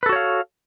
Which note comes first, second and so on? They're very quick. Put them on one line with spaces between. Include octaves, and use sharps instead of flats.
B4 A4 F#4 C#5 F5